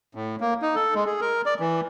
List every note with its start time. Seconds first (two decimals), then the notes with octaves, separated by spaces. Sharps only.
0.15 A2
0.40 A#3
0.62 D#4
0.76 A4
0.95 G#3
1.06 G#4
1.21 A#4
1.46 D5
1.60 E3